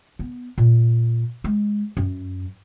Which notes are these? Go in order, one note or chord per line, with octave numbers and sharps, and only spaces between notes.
B3
A#2
G#3
F#2